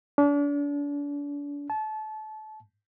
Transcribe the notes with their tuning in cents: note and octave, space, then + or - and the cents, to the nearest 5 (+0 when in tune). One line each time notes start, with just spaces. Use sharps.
D4 -35
A5 -30